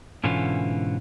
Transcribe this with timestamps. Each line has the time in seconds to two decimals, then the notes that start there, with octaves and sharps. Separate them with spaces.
0.24 G#2 B2 D3 E3 C#4 F4